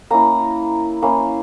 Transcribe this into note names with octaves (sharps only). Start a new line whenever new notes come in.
A#3 C#4 E4 A#5
A#3 C#4 E4